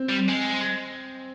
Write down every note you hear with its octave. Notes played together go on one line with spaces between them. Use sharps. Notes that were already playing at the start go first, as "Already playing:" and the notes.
Already playing: C4
G3
G#3